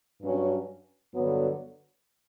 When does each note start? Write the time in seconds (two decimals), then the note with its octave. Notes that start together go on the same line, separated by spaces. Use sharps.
0.22 G2 F#3 C#4
1.15 G2 D3 F#3 B3